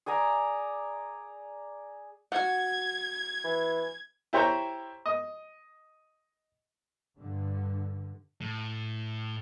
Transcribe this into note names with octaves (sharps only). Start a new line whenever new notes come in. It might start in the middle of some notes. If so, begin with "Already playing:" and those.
G#4 D5 G#5 A#5
F#4 F#5 G#6
E3
E4 G4 C5 C#5 G5 A#5
D#5
G2 D3
A2